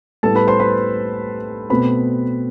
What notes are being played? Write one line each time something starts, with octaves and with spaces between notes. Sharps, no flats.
A2 G3 B3 A4 A5
B4 B5
C5 C6
B4 B5
B2 A3 C4 B4 B5